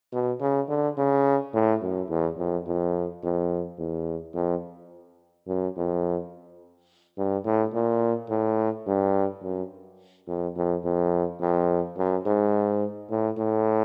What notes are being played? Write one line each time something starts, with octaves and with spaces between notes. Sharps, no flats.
B2
C#3
D3
C#3
A2
F#2
E2
F2
F2
F2
E2
F2
F#2
F2
G2
A2
A#2
A2
G2
F#2
F2
F2
F2
F2
F#2
G#2
A2
A2